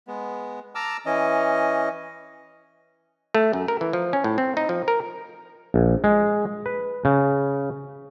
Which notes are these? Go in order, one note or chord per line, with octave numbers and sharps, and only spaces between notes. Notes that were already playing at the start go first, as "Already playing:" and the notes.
G#3 B3
A5 A#5 D6 E6 F6
E3 C#4 D#5
A3
F#2
A#4
E3
F3
C#4
A2
C4
D#4
F3
A#4
A#1
G#3
B4
C#3